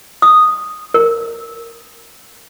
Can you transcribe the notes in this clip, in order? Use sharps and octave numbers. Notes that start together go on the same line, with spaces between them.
D#6
A#4